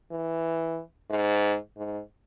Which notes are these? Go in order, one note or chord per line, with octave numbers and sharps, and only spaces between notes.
E3
G#2
G#2